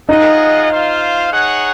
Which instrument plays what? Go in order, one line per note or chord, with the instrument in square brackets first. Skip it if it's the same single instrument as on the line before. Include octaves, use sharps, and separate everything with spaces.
[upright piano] D#4 [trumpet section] F4 G#4 D#5 F#5
[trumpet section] F4 C5 F5
D#4 G#4 C#5 F#5